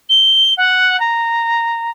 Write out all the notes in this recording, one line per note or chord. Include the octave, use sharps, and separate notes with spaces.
G7
F#5
A#5